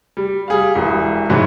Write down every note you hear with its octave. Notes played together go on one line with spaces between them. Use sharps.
G3
G3 G#4 F5
E1 E3
G#2 E3 F#3